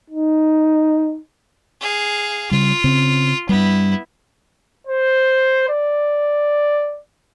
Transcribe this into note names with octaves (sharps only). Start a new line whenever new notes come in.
D#4
G#4 F5
C#3 G3 F4
C#3 C4
G2 G3 B3 E4
C5
D5